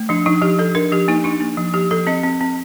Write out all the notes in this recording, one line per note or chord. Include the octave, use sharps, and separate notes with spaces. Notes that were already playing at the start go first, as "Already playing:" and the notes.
Already playing: A3
F3 D4
F3 D#4
F3 G4
F3 A4
D4 A#4
F3 G4
A#3 D#4
D4 D#4
A#3
F3
F3 G4
F3 A4
C4 D#5
C4
C4